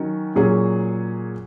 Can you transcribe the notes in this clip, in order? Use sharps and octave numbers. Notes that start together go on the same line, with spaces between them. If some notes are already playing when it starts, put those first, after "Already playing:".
Already playing: D#3 F#3 C#4
A#2 F#3 C#4 G#4